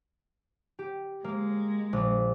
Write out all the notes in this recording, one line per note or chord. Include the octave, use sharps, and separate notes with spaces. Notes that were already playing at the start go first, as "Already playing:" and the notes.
G4
G#3 A#3
A#1